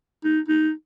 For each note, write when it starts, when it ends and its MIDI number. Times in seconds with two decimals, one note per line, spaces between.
0.24 0.40 63
0.48 0.71 63